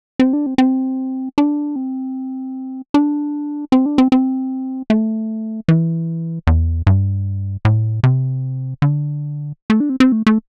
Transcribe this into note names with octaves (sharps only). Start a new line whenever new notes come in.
C4
D4
C4
C4
D4
C4
D4
C4
D4
C4
C4
A3
E3
E2
G2
A2
C3
D3
A3
D4
C4
C4
A3
A3